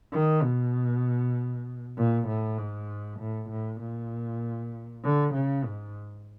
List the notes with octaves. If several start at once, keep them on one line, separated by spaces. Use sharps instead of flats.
D#3
B2
A#2
A2
G#2
A2
A2
A#2
D3
C#3
G#2